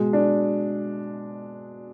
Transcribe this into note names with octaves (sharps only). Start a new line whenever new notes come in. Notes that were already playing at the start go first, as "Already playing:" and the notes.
Already playing: B2 G#3
D4